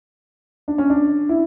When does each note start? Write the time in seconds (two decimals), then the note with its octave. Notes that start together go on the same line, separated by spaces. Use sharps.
0.68 D4
0.78 C#4
0.90 D4
1.29 E4